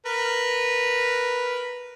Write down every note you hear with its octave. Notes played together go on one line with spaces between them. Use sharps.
A#4 B4